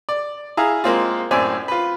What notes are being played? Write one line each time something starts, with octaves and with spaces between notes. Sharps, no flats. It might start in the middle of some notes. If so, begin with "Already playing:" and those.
D5
E4 G#4 F5 A#5
G#3 A#3 C4 F4
F#2 A2 C4 D5 G#5 E6
F4 B4